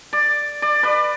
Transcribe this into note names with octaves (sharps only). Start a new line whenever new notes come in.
D5
D5
B4 D5